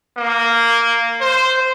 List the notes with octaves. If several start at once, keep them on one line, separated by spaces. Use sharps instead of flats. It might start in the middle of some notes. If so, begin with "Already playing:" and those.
A#3
C5